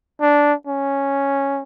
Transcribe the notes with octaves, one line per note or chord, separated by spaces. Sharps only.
D4
C#4